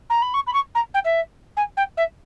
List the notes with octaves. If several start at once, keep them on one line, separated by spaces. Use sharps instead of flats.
A#5
B5
C#6
B5
C#6
A#5
G5
E5
G#5
G5
E5